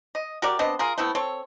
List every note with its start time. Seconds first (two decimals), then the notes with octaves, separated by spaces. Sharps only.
0.15 D#5
0.42 F#4 G4 A#4 D5
0.59 B3 C4 D4 D#5
0.79 F4 G#4 A#4
0.98 A3 B3 C4 E4
1.15 C4 A4 C#5